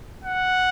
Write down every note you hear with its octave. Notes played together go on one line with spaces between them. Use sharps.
F#5